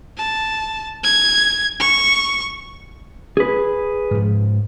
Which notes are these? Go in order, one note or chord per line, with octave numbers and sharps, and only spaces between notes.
A5
G#6
C#6
G#4 B4
G#2 F3